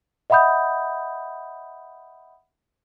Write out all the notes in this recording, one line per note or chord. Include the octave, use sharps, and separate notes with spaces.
D#5 E5 F#5 B5 D#6 G6